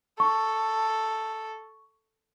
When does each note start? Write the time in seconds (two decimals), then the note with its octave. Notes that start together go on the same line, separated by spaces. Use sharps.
0.20 A4 C#6